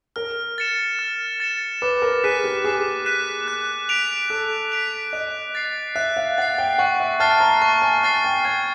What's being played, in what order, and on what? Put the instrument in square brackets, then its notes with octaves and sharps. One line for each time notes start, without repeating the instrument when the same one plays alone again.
[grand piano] A#4 [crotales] F6
[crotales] A6 C#7 E7
F6
A6 C#7 E7
[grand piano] B4 [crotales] D6
[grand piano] A#4
[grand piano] G#4 [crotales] F#6 B6 D#7
[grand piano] G4
[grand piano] G#4 [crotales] D6
[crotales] F#6 B6 D#7
F#6
B6 D7 F7
[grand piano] A4 [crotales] F#6
[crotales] B6 D7 F7
[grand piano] D#5 [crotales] F#6
[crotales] A6 C7
[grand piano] E5 [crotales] F#6
[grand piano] F5
[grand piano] F#5 [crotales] A6 C7
[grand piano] G5
[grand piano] F#5 [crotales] C#6
[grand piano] E5
[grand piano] A5 [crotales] F6 A6 C7
[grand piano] A#5
[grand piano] A5 [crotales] C#6
[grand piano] G#5
[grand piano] G#5 [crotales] F6 A6 C7
[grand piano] G5
[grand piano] G5 [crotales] G#6